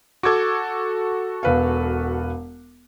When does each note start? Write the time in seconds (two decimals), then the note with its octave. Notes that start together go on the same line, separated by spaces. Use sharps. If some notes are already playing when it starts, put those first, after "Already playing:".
0.23 F#4 A4 D6 G#6
1.43 E1 B4 F5